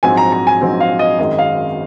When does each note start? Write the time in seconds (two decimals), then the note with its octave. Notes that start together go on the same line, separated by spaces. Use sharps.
0.03 A#1 G#2 F#3 C4 G#5
0.17 A#5
0.32 A#5
0.47 G#5
0.61 A#1 G#2 F#3 C4
0.80 F5
0.99 D#5
1.19 G#1 F#2 D#3 G#3 D#5
1.39 F5